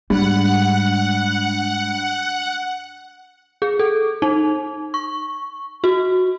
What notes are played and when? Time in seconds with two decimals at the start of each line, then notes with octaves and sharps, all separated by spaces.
0.10 G#2 G3 D4 F#5
3.62 G#4
3.79 A4
4.22 D#4
4.94 C#6
5.84 F#4